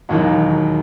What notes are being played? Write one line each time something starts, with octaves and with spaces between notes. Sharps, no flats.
E1 D#2 D#3 F#3 D#4 F#4